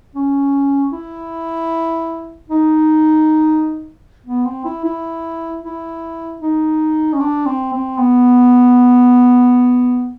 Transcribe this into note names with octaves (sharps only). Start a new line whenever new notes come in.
C#4
E4
D#4
B3
C4
E4
E4
E4
D#4
C#4
D4
C4
C4
B3